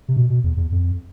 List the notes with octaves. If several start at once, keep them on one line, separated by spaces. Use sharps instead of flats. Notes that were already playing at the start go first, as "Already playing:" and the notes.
C3
B2
B2
E2
E2
F2